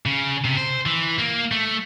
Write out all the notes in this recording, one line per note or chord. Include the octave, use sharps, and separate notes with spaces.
C#3
C3
C5
E3
A#3
A3